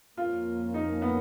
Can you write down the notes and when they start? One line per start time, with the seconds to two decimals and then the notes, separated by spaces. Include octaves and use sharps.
0.17 F2 F3 A#3 C#4 F4
0.74 D#4
1.02 B3